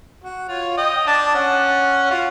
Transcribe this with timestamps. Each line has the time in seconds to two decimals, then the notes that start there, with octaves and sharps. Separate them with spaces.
0.24 F#4
0.49 F4 C#5
0.77 D#5 G5
1.07 D4 A5 D6
1.34 C#4 F#5
2.11 F4 F#4